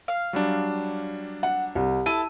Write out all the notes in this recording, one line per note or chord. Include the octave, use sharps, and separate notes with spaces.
F5
F#3 G3 D4
F#5
C2
E4 A4 D#7